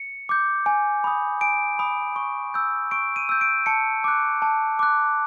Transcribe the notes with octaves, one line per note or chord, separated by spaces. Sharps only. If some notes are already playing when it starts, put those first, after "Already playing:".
Already playing: C#7
D6 G6
G#5
B5 D#6
G#5 D7
B5 D#6
C#6
E6 G6
C#6 D7
D#7
E6 G6
D7
A5 C#7
D6 F#6
A5
D6 F#6